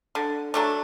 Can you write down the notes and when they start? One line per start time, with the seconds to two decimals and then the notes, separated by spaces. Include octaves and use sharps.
0.15 D3
0.54 F#3 A3 D4